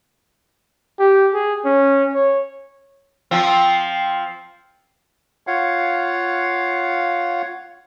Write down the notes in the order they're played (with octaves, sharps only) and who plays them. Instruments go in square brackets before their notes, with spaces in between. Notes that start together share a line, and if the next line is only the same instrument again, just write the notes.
[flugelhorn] G4
G#4
C#4
C#5
[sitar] F3 C4
[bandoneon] F4 C#5 F5 F#5